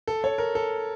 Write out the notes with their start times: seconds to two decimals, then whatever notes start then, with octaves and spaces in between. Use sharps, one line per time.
0.07 A4
0.24 C#5
0.38 A#4
0.55 A4